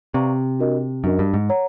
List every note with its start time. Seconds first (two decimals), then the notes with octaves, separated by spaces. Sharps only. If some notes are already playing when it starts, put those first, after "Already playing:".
0.14 C3 B4 D5 F5 A#5 C#6
0.59 D4 F#4 A#4 D#5
1.04 F#2 D4 F#4 A#4 D#5
1.19 G2
1.34 G#2
1.49 C#5 F#5 A#5